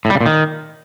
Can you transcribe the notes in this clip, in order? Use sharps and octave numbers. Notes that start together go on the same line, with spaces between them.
A2
G3
C#3
A#2
D#3